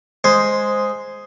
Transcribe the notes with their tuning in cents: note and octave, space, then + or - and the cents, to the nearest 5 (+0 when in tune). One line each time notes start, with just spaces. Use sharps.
G#3 +0 C5 +0